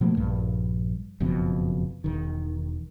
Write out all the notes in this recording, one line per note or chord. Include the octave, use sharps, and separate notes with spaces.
B2 F3 A3 A#3
A#1 G2
F#1 F2 B2
E1 D#3